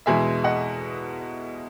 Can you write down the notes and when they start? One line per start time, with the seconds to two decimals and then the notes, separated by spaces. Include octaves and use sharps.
0.06 E2 B2 G#3 E5 G#5
0.44 D#5 F#5